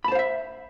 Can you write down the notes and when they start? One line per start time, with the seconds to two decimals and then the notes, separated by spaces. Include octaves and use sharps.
0.04 B5
0.08 A5
0.12 C5
0.15 F5
0.19 E5